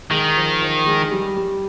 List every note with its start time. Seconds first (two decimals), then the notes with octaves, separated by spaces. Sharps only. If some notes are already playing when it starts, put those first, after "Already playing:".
0.11 D#3 G#3
0.37 F3
0.62 F3
0.86 G#3
1.11 G3
1.37 G3